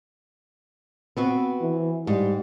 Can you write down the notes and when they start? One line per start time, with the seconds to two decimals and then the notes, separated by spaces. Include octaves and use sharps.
1.17 B3 C4 F#4
1.61 E3
2.07 G#2 G3